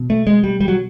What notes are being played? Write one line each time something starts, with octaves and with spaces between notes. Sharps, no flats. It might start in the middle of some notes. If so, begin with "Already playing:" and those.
Already playing: B2
A3
G#3
G3
G3
F#3